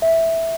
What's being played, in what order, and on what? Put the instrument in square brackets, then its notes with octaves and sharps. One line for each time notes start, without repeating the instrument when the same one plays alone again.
[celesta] E5